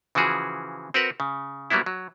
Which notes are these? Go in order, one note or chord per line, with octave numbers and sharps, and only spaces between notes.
C#3 E3 F3 F#4 G#4
C4 F#4 A#4 B4 F#5
C#3
F#3 G3 A#3 B3 E4
F#3